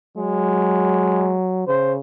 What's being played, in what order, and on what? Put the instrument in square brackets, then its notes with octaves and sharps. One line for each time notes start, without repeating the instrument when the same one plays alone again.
[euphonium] F#3 [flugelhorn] G#3
[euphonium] C#3 [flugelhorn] C5